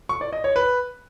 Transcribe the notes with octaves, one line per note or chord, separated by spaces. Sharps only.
C#6
D5
D#5
C#5
B4